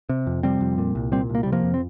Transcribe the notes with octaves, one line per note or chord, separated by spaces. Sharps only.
C3
F2
C3 G3 C4
F2
A#2
C2
A#2 G3 C4
C2
A#3
C3 G3
F3 A#3
F2
C4